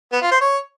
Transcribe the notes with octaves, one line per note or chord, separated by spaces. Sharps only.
B3
F4
C5
C#5